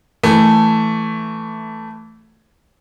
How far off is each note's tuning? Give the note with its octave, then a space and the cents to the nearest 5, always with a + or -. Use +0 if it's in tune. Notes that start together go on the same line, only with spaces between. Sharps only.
E3 +0 A3 +5